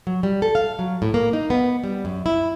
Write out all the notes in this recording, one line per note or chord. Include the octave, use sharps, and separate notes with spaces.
F#3
G3
A4
F5
F#3
A2
A#3
D#4
B3
G3
F#2
E4